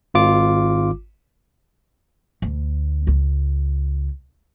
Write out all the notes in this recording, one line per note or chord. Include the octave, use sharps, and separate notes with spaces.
G#1 F4 D6
D2
C#2